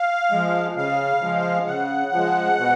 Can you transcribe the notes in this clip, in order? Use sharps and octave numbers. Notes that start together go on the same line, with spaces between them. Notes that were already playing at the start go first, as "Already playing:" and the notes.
Already playing: F5
F3 G#3
C#3 F5
F3 G#3
C#3 F#5
F3 G#3
B2